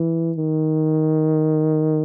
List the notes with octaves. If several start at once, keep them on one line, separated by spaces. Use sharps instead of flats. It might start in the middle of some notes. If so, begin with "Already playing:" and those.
Already playing: E3
D#3